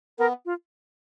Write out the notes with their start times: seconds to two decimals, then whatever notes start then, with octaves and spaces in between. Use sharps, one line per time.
0.19 B3 A#4
0.46 F4